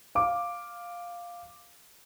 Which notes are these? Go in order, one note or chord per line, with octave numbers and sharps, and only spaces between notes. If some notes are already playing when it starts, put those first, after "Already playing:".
F5 D6